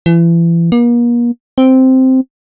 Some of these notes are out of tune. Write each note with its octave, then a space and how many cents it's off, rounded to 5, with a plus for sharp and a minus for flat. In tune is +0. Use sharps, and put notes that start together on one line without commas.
E3 +35
A#3 +40
C4 -5